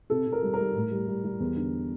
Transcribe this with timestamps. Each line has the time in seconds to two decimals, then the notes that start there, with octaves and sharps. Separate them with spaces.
0.10 C3 A4
0.26 C3
0.32 A#4
0.43 G3
0.53 A#4
0.59 G3
0.75 A2
0.91 G3
1.08 G3
1.24 G3
1.40 E2
1.56 D3